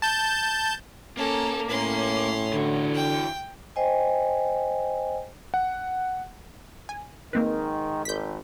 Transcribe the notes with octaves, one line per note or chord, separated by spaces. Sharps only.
A5 G6
A#3 C#4 A4
A2 C#4 C6
D3 E3 F#4
G5
C5 D#5 G5 G#5
F#5
G#5
G#2 D#3 A#3 C4 B4
G#1 G6 B6